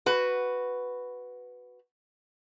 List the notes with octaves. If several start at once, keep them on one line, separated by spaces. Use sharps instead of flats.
F#4 B4